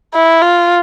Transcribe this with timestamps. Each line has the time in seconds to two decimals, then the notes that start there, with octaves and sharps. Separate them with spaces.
0.14 E4
0.42 F4